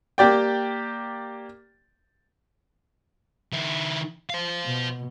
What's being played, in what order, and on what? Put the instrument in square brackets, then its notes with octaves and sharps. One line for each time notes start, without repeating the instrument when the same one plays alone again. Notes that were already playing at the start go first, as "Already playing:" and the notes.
[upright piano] A#3 G4 D5 G5
[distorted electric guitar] D#3 E4
C5 F5
[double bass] B2